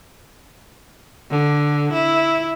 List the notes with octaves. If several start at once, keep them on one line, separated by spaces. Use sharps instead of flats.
D3
E4